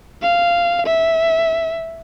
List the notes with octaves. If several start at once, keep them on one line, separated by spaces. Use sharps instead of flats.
F5
E5